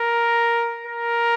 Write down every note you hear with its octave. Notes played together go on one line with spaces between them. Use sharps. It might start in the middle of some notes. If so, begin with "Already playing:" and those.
Already playing: A#4
A#4